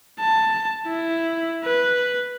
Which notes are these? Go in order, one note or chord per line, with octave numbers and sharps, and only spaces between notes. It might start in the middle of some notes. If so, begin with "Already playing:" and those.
A5
E4
B4